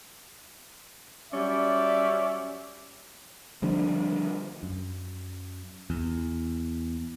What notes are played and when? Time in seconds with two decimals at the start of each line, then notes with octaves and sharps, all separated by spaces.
1.32 F#3 G3 C#4 D5 E5
3.62 D3 F3 G3 D4
4.63 F#2
5.90 E2